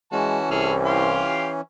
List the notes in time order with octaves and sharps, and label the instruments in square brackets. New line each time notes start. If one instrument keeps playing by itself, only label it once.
[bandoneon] E3 C#4 [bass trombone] G#3 [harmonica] F#4 A5
[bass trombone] C2 [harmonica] G#4 A4 F6
[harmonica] G4 F5 C6